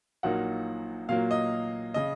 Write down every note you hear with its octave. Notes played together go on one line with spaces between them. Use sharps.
A#1 A#2 F#3 A#3 D#4 F#5
A#2 F#3 A#3 F5
D#5
C#3 D#5